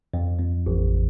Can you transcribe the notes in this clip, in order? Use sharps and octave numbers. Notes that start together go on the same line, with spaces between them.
F2
F2
A1